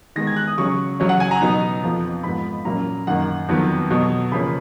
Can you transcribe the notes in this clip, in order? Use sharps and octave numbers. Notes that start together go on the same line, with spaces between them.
D#3 G#3 B3 A#6
G#6
F#6
D#6
C#3 F#3 C#4 C#6
C#3 F#3 C#4
F#5
G#5
A#5
B2 F#3 B3 D#4
F2 F3 B3
G#2 F3 B3 B5
A#2 F#3 A#3 C#4 A#5
F#2 D#3 A#3 D#4 F#5
F2 D#3 F#3 B3
B2 F#3 B3
C#3 F3 A#3 C#4 B5